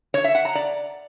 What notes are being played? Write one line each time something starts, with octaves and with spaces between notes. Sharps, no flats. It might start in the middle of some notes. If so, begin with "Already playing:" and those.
C#5
E5
F#5
A#5
D5